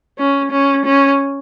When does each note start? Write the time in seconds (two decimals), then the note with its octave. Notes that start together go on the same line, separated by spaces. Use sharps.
0.18 C#4
0.51 C#4
0.85 C#4